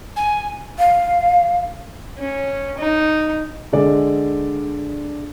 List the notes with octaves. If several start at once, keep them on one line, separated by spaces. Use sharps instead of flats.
G#5
F5
C#4
D#4
D3 G#3 D5